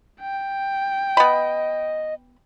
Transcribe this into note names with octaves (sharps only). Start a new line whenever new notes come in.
G5
B3 D#5 B5